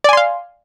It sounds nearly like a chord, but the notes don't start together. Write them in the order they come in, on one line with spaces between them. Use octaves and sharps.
D5 G#5 C6 F5